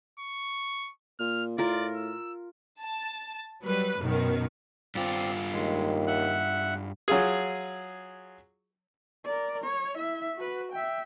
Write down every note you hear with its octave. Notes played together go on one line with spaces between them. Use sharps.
C#6
A#2 F6
A2 F4 A#4 D5
E6
A5
F#3 G3 B4
F#2 B2 D#3
G2 C4 F4 D5
D#2 G#3
E5 F#5 F#6
F#3 F4 G#4
A#4 D5
C#5
E4 E5
F#4 B4
E5 G5